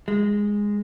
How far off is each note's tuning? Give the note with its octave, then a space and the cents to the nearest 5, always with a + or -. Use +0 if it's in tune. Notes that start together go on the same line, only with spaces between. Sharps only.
G#3 -10